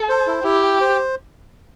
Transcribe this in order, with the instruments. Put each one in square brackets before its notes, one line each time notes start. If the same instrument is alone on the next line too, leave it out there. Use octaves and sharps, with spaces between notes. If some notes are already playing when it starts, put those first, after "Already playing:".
Already playing: [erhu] A4
[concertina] C5
E4
[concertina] E4 [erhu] G4
[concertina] G5
C5